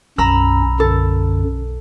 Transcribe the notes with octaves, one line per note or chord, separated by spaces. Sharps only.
B1 F#2 C#4 A#5 B5 E6
F#2 D3 A4